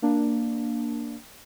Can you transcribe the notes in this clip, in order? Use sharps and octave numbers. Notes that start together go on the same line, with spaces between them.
A#3 D4